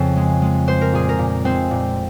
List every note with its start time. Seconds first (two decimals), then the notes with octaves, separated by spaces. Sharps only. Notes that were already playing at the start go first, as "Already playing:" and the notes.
Already playing: F2 C#3 C4
0.16 G#3
0.42 G#3
0.67 G#3 C5
0.81 A#4
0.93 A#2 G#4
1.09 A#4
1.19 A#2
1.45 G#3 C4 C5
1.71 A#2